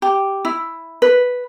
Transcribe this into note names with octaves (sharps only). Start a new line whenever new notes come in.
G4
E4
B4